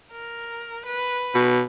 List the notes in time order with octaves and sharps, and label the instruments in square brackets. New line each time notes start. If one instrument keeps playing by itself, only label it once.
[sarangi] A#4
B4
[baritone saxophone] B2